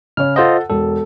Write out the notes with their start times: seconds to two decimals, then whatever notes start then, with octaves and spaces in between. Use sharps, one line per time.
0.17 C#3 C#5 F6
0.36 F4 A4 C5 D#5 F#5
0.70 E1 A4